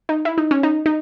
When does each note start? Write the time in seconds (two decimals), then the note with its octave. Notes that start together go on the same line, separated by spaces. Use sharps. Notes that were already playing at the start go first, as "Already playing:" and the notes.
0.09 D#4
0.25 E4
0.38 D#4
0.51 C#4
0.63 D#4
0.86 D#4